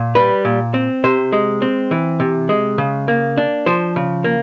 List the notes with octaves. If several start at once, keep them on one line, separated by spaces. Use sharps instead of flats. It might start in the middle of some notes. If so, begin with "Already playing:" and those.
Already playing: A#2
G3 B4
A#2
C4
C3 C5
G#3
C4
E3
C3
G#3
C#3
A#3
D4
F3 C5
C#3
A#3